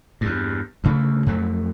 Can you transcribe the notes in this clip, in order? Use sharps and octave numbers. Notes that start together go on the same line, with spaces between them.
E2 G2
D2 C#3 A3
F2 F#3 A3